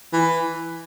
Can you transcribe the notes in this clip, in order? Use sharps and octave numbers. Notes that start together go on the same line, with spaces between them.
E3